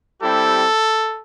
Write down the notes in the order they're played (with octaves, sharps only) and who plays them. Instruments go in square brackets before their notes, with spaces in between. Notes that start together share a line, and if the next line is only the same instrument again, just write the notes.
[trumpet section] G3 C4 E4 G4 A4